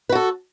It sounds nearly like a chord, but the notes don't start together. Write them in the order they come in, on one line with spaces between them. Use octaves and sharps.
B4 F#4 A4